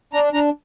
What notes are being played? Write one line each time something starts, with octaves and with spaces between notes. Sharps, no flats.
D4 A#5
D4 A#5